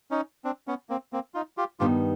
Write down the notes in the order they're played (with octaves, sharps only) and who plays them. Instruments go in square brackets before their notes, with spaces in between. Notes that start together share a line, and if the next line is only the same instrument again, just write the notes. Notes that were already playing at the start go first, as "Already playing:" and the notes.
[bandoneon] C#4 D#4
C4 D4
B3 C#4
A#3 C4
A#3 C4
D#4 F4
F4 G4
[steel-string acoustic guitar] G2 D#3 G3 B3 D#4 [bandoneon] F4 G4